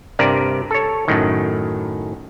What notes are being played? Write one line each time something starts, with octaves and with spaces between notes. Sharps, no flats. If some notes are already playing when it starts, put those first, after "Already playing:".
G2 C3 A#4 D5
A4 C#5
F#2 A2 D#3